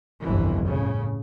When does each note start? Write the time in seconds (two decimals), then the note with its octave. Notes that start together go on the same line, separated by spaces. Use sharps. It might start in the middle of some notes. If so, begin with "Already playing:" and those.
0.23 G1 C2 F2 B2 E3
0.66 A2 C#3